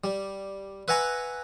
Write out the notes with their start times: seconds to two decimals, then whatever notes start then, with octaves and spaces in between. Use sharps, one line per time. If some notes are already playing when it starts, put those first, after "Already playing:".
0.04 G3
0.88 B4 E5 F#5 G#5 A#5 C#6